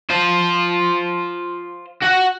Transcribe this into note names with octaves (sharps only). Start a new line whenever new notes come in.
F4 C5
F#4 F#5